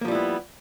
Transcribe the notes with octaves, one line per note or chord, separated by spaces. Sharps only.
F3 G3 A#3 B3 E4